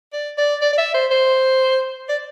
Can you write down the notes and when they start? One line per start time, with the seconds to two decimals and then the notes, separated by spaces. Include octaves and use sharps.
0.13 D5
0.38 D5
0.62 D5
0.73 D5
0.78 E5
0.94 C5
1.11 C5
2.09 D5